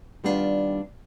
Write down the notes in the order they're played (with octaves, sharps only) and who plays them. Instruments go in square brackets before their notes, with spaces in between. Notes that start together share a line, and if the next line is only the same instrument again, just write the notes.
[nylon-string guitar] D#3 G3 B3 D4 F4